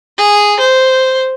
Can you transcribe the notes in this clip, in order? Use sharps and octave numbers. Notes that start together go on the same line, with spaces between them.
G#4
C5